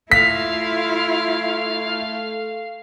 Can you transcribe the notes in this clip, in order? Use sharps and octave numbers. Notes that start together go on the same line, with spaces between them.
A3 E4 F4 F5 B6